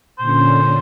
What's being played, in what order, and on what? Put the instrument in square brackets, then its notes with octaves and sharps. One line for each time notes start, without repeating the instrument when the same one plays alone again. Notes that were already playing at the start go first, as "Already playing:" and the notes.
[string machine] A#2 D3 C#4 [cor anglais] C5